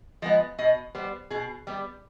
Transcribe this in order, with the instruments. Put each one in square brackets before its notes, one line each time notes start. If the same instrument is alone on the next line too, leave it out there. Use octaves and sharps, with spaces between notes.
[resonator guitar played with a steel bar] F3 G#3 B3 D#5
B2 D#5
G3 B3 C5
B2 G#4
G3 B3 G4